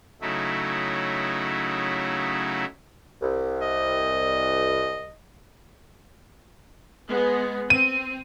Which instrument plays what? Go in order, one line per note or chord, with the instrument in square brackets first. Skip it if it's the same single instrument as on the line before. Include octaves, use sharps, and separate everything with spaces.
[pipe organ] C#3 F#3 A3 D#4 E4
[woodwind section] C2
[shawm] D#5
[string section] G#3 B3
[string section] C4 [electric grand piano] D#7